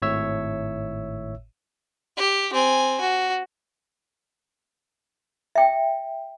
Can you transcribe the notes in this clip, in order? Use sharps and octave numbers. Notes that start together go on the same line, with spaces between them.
G#1 A2 C#5 E5 E6
G4
C4 G#5
F#4
E5 G5